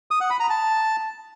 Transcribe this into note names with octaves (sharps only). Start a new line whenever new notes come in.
D#6
F#5
B5
A#5
A5